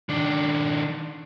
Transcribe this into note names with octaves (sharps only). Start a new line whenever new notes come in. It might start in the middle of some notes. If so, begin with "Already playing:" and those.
D#3 D4